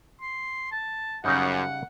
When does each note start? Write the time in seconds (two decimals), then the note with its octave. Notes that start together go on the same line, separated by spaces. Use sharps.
0.21 C6
0.72 A5
1.24 F#2 C#3 G3 D#4 F#5